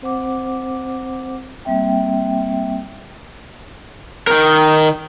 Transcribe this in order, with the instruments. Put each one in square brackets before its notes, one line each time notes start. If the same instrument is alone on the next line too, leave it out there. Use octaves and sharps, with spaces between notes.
[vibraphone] C4 C5 F#5 D6
G3 A#3 C4 E5 G5
[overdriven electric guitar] D#3 A#4